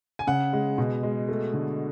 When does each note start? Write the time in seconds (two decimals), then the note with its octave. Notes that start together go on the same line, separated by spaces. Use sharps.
0.19 G#5
0.27 C#3 F#5
0.53 G#3
0.78 B2
1.03 G#3
1.29 A3
1.54 D3